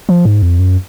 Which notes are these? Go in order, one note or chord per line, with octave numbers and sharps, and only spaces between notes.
F3
G#2
F2
F#2